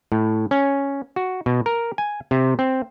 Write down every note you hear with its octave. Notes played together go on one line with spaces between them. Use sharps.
A2
C#4
F#4
B2
A#4
G#5
C3
C4